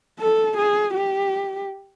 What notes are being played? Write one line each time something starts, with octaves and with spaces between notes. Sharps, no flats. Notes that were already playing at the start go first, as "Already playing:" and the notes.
A4
G#4
G4